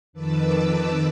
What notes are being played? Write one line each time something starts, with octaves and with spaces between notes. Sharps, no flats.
F2 D#3 B4 A5 D6 E6